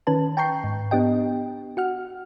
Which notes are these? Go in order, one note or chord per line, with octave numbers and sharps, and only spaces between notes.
D#3 C#4 B4 A5
G5 A5 A#5 C#6 G6 C7
G#2
B3 D4 G4 D#5 G5
F#4 F#5 F6